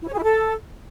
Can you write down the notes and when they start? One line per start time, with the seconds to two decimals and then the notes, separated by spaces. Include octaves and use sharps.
0.03 E4
0.08 C#5
0.13 G#4
0.18 E4
0.23 A4